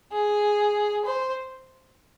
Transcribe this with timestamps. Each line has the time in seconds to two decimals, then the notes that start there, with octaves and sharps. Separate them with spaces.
0.12 G#4
1.05 C5